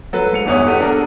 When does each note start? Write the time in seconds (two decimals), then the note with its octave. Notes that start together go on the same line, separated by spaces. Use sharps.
0.13 F#3 A4 B4
0.33 G#2 C#7 F7
0.46 G1 E2 B3 C#5 D#6
0.65 E2 B3 G4 A4 D#7
0.80 D4 A4 A#4 A#5